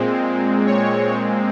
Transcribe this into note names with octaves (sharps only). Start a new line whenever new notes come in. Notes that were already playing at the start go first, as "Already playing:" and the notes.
Already playing: A#2 G#3 C4
C#5